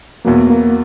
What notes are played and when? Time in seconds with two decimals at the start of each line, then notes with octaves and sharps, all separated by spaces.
0.25 E2 B2 F#3 A#3
0.50 A#3